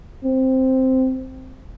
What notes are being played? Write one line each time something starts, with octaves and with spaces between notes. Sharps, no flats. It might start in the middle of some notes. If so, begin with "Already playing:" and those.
C4